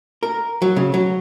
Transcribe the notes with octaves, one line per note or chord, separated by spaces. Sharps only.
A#4
F#3
C#3
F#3